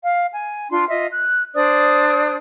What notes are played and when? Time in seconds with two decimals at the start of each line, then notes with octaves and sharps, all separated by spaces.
0.03 F5
0.34 G#5
0.71 D4 F4 C6
0.88 F4 D#5 E5
1.11 F#6
1.54 D4 C5 D5 D#6